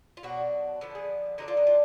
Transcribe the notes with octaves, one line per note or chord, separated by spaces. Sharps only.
F4
B2 F#3 D4 F#4
D3 F3 B3
G#4
D3 F#3 D4 D#4
F4
D#4
F4